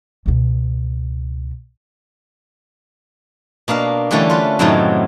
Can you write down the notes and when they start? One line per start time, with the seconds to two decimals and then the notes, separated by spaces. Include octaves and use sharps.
0.26 C#2 B2
3.68 B2 A#3 D4 F5
4.11 D3 E3 G3 A3 C#4 D4
4.30 F4 B4
4.59 F#2 A2 C3 D#3 F#3 A3